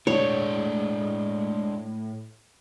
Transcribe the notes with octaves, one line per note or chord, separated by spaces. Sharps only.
A2 G#3 D4 C#5